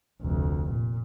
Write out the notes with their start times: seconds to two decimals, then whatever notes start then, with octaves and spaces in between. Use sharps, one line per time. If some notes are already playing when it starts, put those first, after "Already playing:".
0.21 F1 D2
0.71 A#2